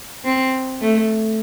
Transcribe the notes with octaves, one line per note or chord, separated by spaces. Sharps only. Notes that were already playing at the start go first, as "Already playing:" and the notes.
C4
A3